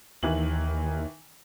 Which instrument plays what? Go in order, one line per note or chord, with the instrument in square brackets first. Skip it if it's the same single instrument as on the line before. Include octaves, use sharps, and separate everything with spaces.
[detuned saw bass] D#2 [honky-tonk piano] D#3 E3 F#7